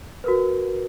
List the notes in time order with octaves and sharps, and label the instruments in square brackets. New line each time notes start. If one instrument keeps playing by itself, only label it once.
[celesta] F#4 A#4 B4